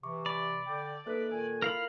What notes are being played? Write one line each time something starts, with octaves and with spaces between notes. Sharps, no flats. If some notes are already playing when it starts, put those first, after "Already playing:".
C3 E3 C#6 D6
D5 B5
D3 G5 D6
A#3 D#4 A4 B4 E5 F#6
A#2 D#3 G#5
E4 F4 A#4 F5 B5